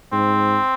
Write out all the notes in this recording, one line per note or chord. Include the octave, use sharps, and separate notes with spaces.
G#2 C4